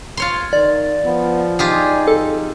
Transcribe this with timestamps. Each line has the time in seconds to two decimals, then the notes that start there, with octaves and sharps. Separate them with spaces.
0.17 F4 C#5 C6
0.53 D#3 D5
1.05 F3 B3
1.59 D#4 F4 G4 G#4
2.08 F2 A4